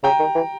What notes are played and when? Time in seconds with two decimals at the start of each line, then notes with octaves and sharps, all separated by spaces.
0.03 C#3 G5 A#5
0.19 D#3
0.35 E3